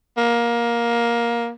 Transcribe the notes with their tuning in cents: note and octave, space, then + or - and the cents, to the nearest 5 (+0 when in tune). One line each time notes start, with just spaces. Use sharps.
A#3 +15